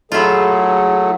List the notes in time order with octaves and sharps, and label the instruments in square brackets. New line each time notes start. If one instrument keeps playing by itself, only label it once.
[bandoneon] F#3 A3 [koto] E4 F4 [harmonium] G#4 A4